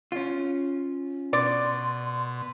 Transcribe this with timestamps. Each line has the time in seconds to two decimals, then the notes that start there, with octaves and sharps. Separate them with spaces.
0.12 C#4 F4
1.33 B2 D5 C6